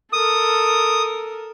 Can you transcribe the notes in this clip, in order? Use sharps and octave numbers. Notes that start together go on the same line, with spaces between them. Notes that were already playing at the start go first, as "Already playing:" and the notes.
A4 A#4 D#6